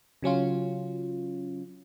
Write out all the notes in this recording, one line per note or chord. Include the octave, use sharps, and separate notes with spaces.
C#3 F#3 C#4 F4